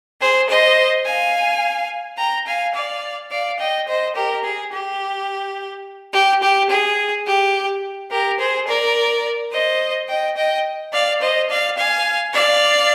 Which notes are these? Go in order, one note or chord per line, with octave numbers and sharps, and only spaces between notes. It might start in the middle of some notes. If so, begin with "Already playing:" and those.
G#4 C5
C5 D#5
F5 G#5
G5 A#5
F5 G#5
D5 F5
D5 F5
D#5 G5
C5 D#5
G4 A#4
G#4
G4
G4
G4
G#4
G4
G4 A#4
G#4 C5
A#4 D5
C5 D#5
D#5 G5
D#5 G5
D5 F5
C5 D#5
D5 F5
F5 G#5
D5 F5